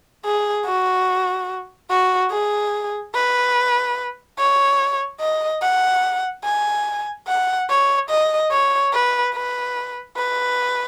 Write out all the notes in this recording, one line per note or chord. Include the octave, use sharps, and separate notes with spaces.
G#4
F#4
F#4
G#4
B4
C#5
D#5
F#5
G#5
F#5
C#5
D#5
C#5
B4
B4
B4